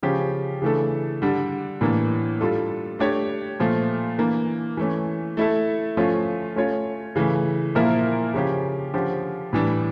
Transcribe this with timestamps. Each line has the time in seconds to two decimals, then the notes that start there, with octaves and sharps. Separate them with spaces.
0.03 C#3 F3 C#4 G4
0.62 C#3 E3 A3 D4 A4
1.22 D3 G3 D4
1.81 A2 E3 A#3 D4
2.41 G3 D4 F4 A4
2.99 A3 D4 G4 C#5
3.60 A#2 F3 A3
4.18 E3 A#3 D4
4.77 E3 A3 C#4
5.37 A3 E4 A4
5.97 F3 A3 C#4 F4
6.56 A3 C#4 F4 C#5
7.16 C#3 E3 A3
7.75 A#2 F3 A#3 E4 A#4
8.34 C#3 F3 C#4 G4
8.93 D3 F3 C#4 G4
9.53 A2 E3 G3 D4